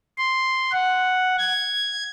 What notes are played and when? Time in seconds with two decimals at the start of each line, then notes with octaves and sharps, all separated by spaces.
0.18 C6
0.72 F#5
1.38 G#6